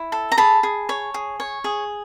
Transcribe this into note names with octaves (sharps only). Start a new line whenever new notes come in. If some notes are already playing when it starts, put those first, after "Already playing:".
Already playing: E4
A4
A#5
G#4 A5 B5
G#4
C#5
G#4
C#5
G#4